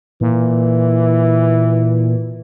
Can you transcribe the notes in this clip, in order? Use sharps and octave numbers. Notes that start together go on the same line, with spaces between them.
A#2 E3